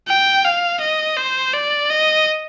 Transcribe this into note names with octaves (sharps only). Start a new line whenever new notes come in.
G5
F5
D#5
C5
D5
D#5